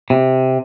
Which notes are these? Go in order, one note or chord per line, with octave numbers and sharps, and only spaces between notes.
C3